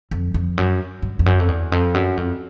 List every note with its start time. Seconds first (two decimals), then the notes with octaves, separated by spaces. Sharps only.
0.11 F2
0.34 F2
0.58 F#2
1.02 G2
1.19 F2
1.26 F#2
1.39 F2
1.48 E2
1.72 F2
1.94 F#2
2.17 F2